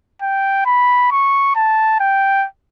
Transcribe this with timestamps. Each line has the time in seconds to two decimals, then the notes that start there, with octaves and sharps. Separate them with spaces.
0.22 G5
0.66 B5
1.11 C#6
1.56 A5
2.00 G5